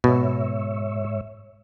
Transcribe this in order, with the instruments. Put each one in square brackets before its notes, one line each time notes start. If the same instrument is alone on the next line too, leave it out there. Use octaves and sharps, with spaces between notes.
[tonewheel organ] G#2 C#5 E5 [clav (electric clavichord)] B2